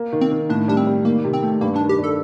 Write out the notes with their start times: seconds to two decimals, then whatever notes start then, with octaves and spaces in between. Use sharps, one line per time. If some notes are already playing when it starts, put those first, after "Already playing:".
Already playing: A#3
0.13 D#3
0.21 C4
0.31 D#3
0.50 A2 D4
0.68 G3 D4
0.77 C4
0.87 G3
1.05 D#3 A#3
1.25 C3
1.33 C4
1.43 A3
1.61 G2 A#3
1.76 D#3 D4
1.89 G4
1.99 D4 A4